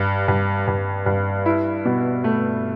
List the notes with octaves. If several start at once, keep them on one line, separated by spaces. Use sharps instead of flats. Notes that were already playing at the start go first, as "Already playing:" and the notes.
Already playing: G2
G2
G2
G2
E4
B2
A3